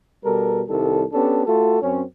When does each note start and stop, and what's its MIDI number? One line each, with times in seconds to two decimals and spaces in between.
0.24 0.62 47
0.24 0.62 55
0.24 0.62 69
0.24 0.62 70
0.67 1.03 36
0.67 1.03 51
0.67 1.03 55
0.67 1.03 69
1.12 1.42 59
1.12 1.42 61
1.12 1.42 62
1.12 1.42 67
1.12 1.42 69
1.45 1.78 57
1.45 1.78 65
1.45 1.78 66
1.45 1.78 69
1.81 2.01 42
1.81 2.01 60
1.81 2.01 61